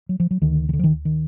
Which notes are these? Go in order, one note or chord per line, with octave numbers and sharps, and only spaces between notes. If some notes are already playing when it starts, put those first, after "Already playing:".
F#3
F3
F#3
D2 D3 D#3
D#3
D3
F3
D#3
D#3